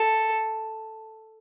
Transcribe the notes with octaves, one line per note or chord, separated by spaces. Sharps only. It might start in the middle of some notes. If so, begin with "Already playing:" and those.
Already playing: A4